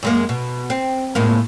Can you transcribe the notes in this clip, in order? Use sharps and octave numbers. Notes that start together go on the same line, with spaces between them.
F#2 G#3 A#3
B2
C4
A2 G#3 A#3